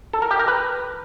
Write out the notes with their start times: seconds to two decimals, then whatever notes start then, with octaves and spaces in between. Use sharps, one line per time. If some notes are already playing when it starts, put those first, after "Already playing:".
0.13 A4
0.22 A#4
0.31 G4
0.39 A#4
0.48 B4